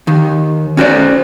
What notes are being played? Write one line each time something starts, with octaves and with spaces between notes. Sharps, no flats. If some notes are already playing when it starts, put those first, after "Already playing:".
D#2 D#3
C#4 F#4 C5 D5